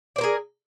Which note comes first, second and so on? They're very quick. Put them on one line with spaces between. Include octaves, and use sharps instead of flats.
D5 C5 A#4 G#4